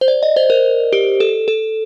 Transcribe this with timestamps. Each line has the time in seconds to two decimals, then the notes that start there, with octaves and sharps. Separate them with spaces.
0.01 C5
0.08 D5
0.23 D#5
0.36 C5
0.50 A#4
0.93 G4
1.20 A4
1.48 A4